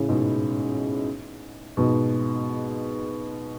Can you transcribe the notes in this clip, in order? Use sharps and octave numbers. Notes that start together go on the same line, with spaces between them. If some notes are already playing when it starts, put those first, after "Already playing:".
Already playing: A2 C#3
G#2 B2
G#2 B2